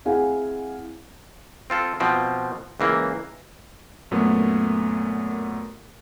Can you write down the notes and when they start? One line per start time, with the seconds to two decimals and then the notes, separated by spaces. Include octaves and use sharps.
0.05 C4 E4 G#4 F5 F#5 G#5
1.70 C4 F4 A4
2.00 B2 F3 C4
2.80 C#2 E3 A#3
4.11 F#2 A#2 A3 B3